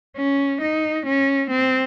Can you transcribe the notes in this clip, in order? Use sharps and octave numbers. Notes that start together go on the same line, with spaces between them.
C#4
D#4
C#4
C4